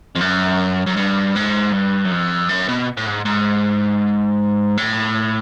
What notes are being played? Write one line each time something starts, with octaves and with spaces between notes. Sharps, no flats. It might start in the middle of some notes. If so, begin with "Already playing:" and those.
F2
F#2
F#2
G2
G#2
G2
F#2
F2
F#2
B2
A2
G#2
G#2
A2